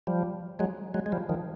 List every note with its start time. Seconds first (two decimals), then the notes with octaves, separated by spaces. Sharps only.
0.07 F3 G3
0.59 F#3 G#3
0.94 F#3 G#3
1.06 G#3
1.12 F3 G3
1.29 D#3 F3